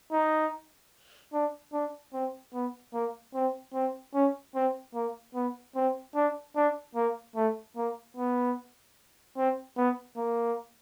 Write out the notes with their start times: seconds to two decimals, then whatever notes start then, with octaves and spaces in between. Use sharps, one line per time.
0.12 D#4
1.33 D4
1.73 D4
2.13 C4
2.54 B3
2.94 A#3
3.35 C4
3.74 C4
4.14 C#4
4.55 C4
4.95 A#3
5.35 B3
5.76 C4
6.16 D4
6.56 D4
6.96 A#3
7.36 A3
7.76 A#3
8.17 B3
9.37 C4
9.77 B3
10.17 A#3